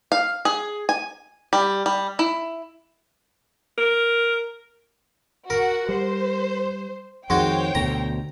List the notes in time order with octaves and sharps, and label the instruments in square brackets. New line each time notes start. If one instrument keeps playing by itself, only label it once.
[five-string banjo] F5
G#4
G#5
G3
G3
E4
[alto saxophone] A#4
[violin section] F#4 F#5 [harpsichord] A#4
[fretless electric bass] G3 [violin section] C5
[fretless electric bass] F2 D#3 [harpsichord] G#3 F#4 [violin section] C5 C#5 G5
[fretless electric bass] D2 B2 D3 [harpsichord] A#5